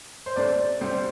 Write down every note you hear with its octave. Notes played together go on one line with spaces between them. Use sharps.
C5
C2 C3 A3 C4 D5
D2 C3 G3 C4 C5